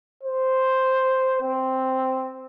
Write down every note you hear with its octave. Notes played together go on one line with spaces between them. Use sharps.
C5
C4